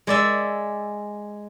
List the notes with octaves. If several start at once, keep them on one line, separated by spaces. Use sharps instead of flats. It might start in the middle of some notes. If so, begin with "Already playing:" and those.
G#3 D5 E5